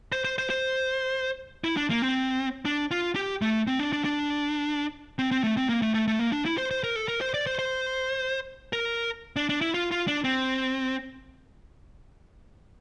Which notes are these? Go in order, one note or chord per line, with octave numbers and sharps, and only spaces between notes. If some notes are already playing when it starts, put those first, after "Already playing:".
C5
C5
C5
C5
E4
D4
A#3
C4
D4
F4
G4
A3
C4
D4
D4
D4
C4
C4
A3
C4
A#3
A3
A3
A3
A#3
D4
E4
C5
C5
A#4
A4
A#4
C5
D5
C5
C5
A#4
D4
D4
E4
F4
F4
D4
C4